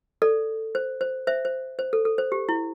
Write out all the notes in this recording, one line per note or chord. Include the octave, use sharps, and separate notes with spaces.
A4 D5
C5
C5
C5 E5
C5
C5
A4
A4
C5
G4
E4